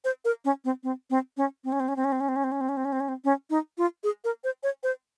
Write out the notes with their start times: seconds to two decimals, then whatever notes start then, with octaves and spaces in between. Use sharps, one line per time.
0.05 C5
0.25 A#4
0.45 C#4
0.65 C4
0.84 C4
1.10 C4
1.37 C#4
1.64 C4
1.72 C#4
1.80 C4
1.88 C#4
1.96 C4
2.04 C#4
2.12 C4
2.20 C#4
2.28 C4
2.36 C#4
2.44 C4
2.52 C#4
2.61 C4
2.69 C#4
2.77 C4
2.85 C#4
2.92 C4
3.00 C#4
3.08 C4
3.24 C#4
3.50 D#4
3.78 F4
4.04 G#4
4.24 A#4
4.44 C5
4.63 C#5
4.83 C5